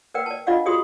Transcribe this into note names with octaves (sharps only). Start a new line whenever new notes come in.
A#4 B4 D5 F#5 G5
D5 A5
D4 F4 D5 D#5 F5 F#5
F4 F#4 G#4 D5 C6 D#6